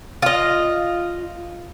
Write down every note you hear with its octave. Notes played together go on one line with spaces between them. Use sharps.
F4 D#5